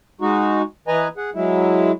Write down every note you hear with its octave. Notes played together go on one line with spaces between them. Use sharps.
G#3 D#4 F#4
E3 B4 D#5 G#5 A#5
G#4 F#5
F#3 G#3 E4